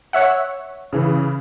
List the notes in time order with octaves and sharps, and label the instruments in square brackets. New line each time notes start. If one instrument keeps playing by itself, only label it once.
[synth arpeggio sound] C#5 E5 F#5
[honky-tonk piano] C#3 E3